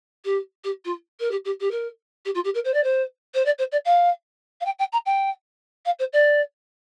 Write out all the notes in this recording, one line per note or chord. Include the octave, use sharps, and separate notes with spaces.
G4
G4
F4
A#4
G4
G4
G4
A#4
G4
F4
G4
A#4
C5
D5
C5
C5
D5
C5
D5
F5
F5
G5
G5
A#5
G5
F5
C5
D5